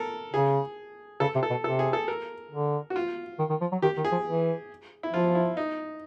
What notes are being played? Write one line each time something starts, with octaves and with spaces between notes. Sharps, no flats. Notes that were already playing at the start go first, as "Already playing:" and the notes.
Already playing: A4 A#4
C#3 G#4
C#3 A4
C3
A4
B2
C3 A4
G#4
A4
A#4
D3
F#4
F4
D#3
D#3
F3
F#3
D#3 G4
D#3
G#4
F3
E3
E4
F3 F4
E4
D#4